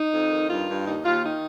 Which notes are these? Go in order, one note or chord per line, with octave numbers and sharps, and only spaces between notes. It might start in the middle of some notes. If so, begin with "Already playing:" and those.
Already playing: D#4
F2
D#3
G2 F4
G2
D#2 D#4
D#2 F4
D#3 D#4